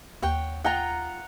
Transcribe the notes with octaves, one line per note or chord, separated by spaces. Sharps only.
D#2 C#5 F#5 G5
F4 F#5 G5 A#5